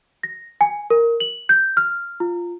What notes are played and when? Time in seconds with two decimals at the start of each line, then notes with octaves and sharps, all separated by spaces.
0.23 A#6
0.61 G#5
0.90 A#4
1.20 F#7
1.49 G6
1.77 F6
2.20 F4